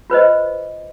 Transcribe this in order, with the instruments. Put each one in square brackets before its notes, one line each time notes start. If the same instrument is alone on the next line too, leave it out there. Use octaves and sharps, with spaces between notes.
[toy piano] F4 B4 C5 D#5